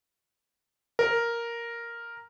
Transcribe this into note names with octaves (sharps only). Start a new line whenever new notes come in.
A#4